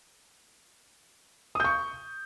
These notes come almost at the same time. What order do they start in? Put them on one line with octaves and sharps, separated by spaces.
D#6 G6 C#6